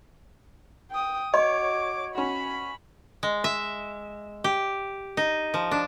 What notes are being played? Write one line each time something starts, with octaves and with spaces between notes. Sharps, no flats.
G5 D#6
F#4 C#5 D#5 D6
C#4 F#4 B5
G#3
E5
G4
D#4
F3
D4